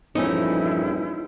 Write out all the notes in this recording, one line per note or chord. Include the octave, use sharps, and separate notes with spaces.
A#1 E2 G2 F3 A3 C#4 D#4 E4